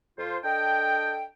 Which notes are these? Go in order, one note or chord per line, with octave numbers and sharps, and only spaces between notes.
F2 F4 C5
D4 A4 D#5 G5